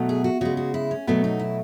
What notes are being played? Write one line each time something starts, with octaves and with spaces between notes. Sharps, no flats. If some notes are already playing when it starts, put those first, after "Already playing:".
Already playing: B2 F#3 A3
G#4
F#4
C#3 G#3 F#4
F#4
E4
C#4
B2 F#3 A3 B3
D#4
E4